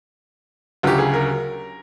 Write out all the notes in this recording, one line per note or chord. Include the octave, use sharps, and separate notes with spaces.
D2 C#3 F#3 G4
G#4
A#4